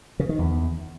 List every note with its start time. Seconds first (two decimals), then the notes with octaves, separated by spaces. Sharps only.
0.20 C#3
0.29 D#3
0.39 E2